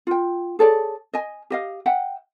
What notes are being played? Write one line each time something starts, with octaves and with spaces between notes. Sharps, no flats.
F4 G5
G#4 A4 C#5 D5
D#5 G#5
G4 D#5 F5
E5 F#5 G5